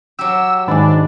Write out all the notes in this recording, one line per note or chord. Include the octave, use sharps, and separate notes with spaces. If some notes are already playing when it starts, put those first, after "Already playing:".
F#3 G4 E6
G#2 D#3 D4 D#5 G#5